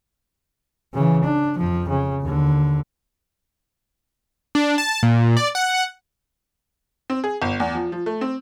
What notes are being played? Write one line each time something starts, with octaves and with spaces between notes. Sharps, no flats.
C#3 E3
D4
F2 F3
C#3
D#2 D3
D4
A5
A#2
D5
F#5
C4
G#4
G1
E2
F3
F3
A3
C4